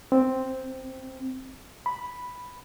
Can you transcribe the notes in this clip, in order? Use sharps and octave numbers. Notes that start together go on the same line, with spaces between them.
C4
B5